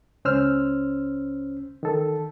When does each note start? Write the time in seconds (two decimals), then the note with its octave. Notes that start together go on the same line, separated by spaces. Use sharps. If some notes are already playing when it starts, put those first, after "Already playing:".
0.25 C#2 C#4 C5 E6 F6
1.83 D#3 A4